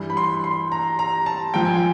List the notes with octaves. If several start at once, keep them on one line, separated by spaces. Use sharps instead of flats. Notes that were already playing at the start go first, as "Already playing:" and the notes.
Already playing: G2 E3
B5
C6
C6
A#5
A#5
A5
G#2 F3 G5
G#5
G5